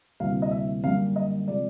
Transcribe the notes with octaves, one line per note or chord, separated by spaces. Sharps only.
D2 C3 E3 G3 A#3 F5
D#5
E5
F#2 D3 G3 A#3 F5
D#5
C3 F3 G#3 D5